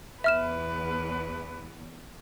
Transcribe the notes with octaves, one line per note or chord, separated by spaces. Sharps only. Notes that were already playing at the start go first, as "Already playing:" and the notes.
E2 B4 E5 F6 E7